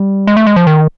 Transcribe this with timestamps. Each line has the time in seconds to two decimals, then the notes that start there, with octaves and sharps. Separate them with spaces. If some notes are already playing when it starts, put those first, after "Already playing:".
Already playing: G3
0.27 G#3
0.37 A3
0.47 G#3
0.56 F3
0.67 D#3